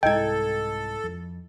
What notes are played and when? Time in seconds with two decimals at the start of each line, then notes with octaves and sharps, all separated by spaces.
0.03 C2 G#2 G#3 E4 A4 D#5 G5 G#6
1.04 F2